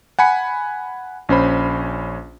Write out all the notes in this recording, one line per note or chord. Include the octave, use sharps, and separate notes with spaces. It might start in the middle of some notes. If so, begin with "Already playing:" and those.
F#5 G#5 B5 C#7
A#1 C#4 C5 B5